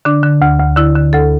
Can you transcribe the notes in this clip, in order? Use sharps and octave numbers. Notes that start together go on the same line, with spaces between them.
D3 D4
D3
D2
D2
D3 E4
D3
D2 A4